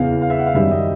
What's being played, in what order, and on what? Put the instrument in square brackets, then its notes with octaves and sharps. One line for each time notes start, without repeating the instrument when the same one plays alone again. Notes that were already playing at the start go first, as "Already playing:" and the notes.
Already playing: [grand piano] E2 C#3 E3 F5
F5
E5
F#5
F5
F#2 D#3 G3 E5
D#5